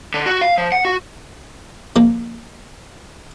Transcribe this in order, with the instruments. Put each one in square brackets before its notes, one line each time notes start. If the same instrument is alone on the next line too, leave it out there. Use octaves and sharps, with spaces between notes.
[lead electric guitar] D3
F#4
F5
F3
F#5
F#4
[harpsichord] F3 A#3